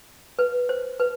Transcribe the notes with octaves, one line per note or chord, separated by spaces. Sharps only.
B4
C5
B4